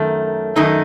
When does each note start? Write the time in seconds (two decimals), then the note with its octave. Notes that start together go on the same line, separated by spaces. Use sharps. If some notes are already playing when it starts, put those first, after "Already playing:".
Already playing: F#2 D#3 A3
0.56 F#2 D#3 A3 D#4